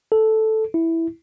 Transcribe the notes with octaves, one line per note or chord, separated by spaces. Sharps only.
A4
E4